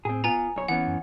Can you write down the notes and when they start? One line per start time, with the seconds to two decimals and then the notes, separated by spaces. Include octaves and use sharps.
0.05 A2 C4 G#4
0.24 B3 F4 G#5 A#5
0.36 D1
0.56 B1 C#5
0.68 E3 B3 C#4 F#5
0.87 F#2